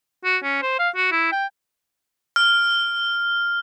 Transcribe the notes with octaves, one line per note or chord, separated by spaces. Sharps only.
F#4
C#4
C5
F5
F#4
E4
G5
F6